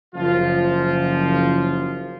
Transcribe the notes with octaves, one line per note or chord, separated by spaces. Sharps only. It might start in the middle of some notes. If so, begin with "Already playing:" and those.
F#1 F3 F4